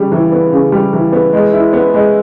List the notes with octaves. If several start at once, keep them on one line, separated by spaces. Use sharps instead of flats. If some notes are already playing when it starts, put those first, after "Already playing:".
Already playing: C#3 G3
E3
B3
C#3
G3
E3
B3
G#3
E4
B3
G#3